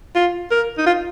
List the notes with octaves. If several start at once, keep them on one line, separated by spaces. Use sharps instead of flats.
F4
A#4
D#4
F4